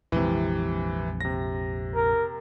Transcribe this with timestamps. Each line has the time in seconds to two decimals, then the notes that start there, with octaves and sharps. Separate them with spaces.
0.12 A#1 F2 C3 E3 G#3
1.21 C3 A#6
1.95 A#4